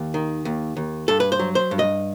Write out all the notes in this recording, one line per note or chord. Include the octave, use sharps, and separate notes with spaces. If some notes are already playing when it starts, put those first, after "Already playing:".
Already playing: D#2
D#3
D#2
D#2
G2 A4
B4
C5
F#3
C5
G2
D#5